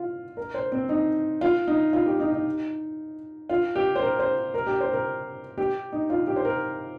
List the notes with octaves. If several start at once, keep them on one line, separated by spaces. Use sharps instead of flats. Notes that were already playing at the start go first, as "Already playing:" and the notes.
Already playing: F4
A#4
C5
C4
D#4
F4
D#4
F4
G4
D#4
D#4
F4
G4
C5
A#4
C5
A#4
G4
C5
A#4
G4
D#4
F4
G4
C5
A#4